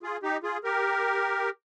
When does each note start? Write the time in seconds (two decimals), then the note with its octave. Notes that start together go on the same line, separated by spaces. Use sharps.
0.03 F4 G#4
0.23 D#4 G4
0.43 F4 G#4
0.64 G4 A#4